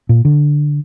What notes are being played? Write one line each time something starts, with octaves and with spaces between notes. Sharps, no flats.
A#2
D3